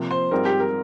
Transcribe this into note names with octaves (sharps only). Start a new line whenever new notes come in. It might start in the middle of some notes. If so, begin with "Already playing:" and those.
Already playing: C3 F3 A#3
C5
G#2 G3 C4 F4 A#4
G4
A#4